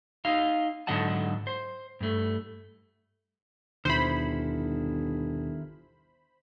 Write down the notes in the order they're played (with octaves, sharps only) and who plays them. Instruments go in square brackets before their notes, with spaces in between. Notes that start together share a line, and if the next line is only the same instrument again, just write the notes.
[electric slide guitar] D#4 D#5 F5
G#2 D3 F#3 D#5 F#5 A5
C5
G2 A3
[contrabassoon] G1 [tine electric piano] D#2 B2 C#7 [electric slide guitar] D#3 E4 [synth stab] C5 B5